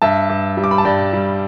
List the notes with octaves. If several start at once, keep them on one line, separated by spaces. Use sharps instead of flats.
G2 E5 A5
G2
G3
D6
B5
A5
G2 D5 G5
G3